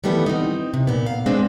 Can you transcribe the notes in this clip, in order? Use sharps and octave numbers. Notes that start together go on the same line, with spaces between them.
D#3 E3 G3 A3 B3
C4 D#4
C3
A#2 B3
F5
G#3 B3 C4 D4